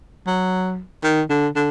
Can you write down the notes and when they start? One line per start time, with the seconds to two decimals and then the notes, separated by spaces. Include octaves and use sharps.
0.27 F#3
1.03 D#3
1.30 D3
1.56 D3